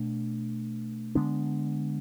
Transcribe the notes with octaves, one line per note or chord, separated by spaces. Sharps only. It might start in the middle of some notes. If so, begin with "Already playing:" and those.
Already playing: B2 A3 D4
D3 G#3 B3 D4